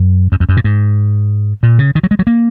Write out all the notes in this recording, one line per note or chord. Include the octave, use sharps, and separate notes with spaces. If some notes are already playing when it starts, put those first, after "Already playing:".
Already playing: F#2
F#2
F2
F#2
A#2
G#2
A#2
C#3
D#3
F#3
G#3
F#3
A#3